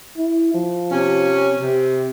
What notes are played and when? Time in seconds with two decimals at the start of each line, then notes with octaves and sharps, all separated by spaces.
0.17 E4
0.54 F3
0.92 C3 C#4
1.61 C3